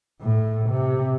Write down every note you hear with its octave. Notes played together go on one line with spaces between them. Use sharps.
A2
C3